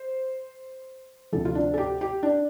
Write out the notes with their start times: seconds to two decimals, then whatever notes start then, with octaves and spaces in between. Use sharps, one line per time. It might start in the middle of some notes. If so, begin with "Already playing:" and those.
Already playing: C5
1.32 D2 C3 F3 A4
1.45 F4
1.55 D4
1.74 A4
1.78 G4
2.01 G4
2.23 D4